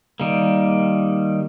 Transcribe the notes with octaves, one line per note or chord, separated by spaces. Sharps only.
D#3 G3 A#3